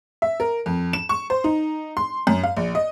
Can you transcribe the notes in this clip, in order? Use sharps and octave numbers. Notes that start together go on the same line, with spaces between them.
E5
A#4
F2
E7
C#6
C5
D#4
C6
F#2
F5
A#1
D#5